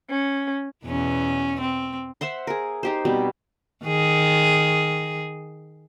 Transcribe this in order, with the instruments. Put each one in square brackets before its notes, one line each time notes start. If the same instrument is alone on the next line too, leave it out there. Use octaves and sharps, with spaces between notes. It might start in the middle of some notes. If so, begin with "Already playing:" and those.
[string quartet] C#4
[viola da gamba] E2 B2 C#4
C4
[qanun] C5 E5 F#5 C6
G#4 A#4
D#4 G4 C5
B2 G3 C4
[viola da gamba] D#3 G#4